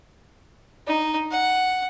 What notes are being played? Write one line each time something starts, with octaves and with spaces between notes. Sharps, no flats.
D#4
F#5